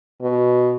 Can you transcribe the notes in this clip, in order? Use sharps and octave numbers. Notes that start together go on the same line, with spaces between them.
B2